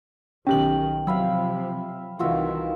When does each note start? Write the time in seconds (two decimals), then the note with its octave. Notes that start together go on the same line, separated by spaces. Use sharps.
0.47 B1 D#3 C#4 G4 G5 F#7
1.07 C3 F3 F#3 E5 F5 B5
2.19 C2 D#3 E3 F4 F#4 E5